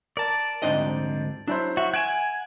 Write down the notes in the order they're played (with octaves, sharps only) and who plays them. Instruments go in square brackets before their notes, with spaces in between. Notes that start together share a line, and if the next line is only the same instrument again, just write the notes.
[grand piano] A#4 [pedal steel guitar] D5 A5
[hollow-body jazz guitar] D2 G#2 D#5 [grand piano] C4 D4 D#4
[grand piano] F#3 E4 C5 [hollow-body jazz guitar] D4
[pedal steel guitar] F#4 [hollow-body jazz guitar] E5
[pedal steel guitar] F#5 G#5 [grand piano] G#6 D7 E7